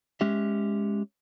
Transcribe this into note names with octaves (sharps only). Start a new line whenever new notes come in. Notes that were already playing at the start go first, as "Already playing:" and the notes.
G#3 C#4 G4 E5